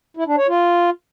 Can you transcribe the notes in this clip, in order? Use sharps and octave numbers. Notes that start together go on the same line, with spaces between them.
E4
D4
C#5
F4